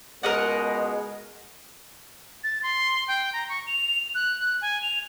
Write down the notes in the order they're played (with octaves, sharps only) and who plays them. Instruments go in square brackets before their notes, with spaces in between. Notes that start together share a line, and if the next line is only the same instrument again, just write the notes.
[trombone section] C#2 B2 G#3 [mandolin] A#4 D#5 F#5
[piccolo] A6
C6
G5
A#5
C#6
F7
F#6
G#5
F7